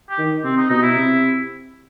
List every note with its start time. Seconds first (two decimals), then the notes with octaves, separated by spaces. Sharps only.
0.10 G4
0.18 D#3
0.44 C3 C4
0.57 D#4
0.70 B2 D#4
0.82 E4
0.95 C3